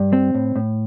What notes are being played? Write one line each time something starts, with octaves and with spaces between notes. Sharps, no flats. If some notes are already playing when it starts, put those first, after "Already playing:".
Already playing: G2
C4
A2
A2